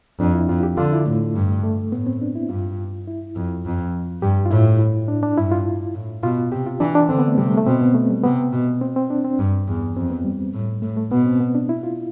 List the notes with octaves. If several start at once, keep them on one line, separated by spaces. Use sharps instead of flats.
F2 D4
E4
F2 F4
G4
D3 F4
E4
A2 A3
G2
A3
A2 B3
C4
D4
E4
G2 F4
E4
F2
F2
G2 G4
F4
A2 E4
D4
D4
G2 E4
F4
A2
B2 F4
C3 G4
F4
E3 D4
D4
D3 C4
B3
A3
C3 G3
A3
A3
B2 C4
B3
A3
G3
C3 B3
B2
C4
C4
D4
C4
G2
E2
F2 C4
B3
G3
A2
A2 A3
A3
B2 B3
C4
B3
D4
E4
F4